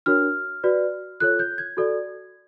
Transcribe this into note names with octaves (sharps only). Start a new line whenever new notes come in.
D4 F#4 A#4 C#5 F6
F#4 B4 D5
F4 A4 C#5 F#6
G6
G#6
F#4 A4 D5